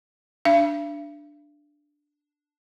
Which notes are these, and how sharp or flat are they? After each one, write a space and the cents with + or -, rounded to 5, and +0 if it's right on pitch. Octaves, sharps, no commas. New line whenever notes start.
D4 +0 E5 +45